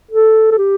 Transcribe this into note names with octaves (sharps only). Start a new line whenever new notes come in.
A4
A4
G4